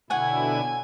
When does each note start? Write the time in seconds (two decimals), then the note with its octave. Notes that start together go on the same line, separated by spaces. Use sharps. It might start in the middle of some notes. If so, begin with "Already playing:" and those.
0.10 B2 D3 E4 C#5 F#5 G#5